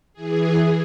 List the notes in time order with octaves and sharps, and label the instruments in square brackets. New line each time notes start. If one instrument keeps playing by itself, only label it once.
[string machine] E3 G#4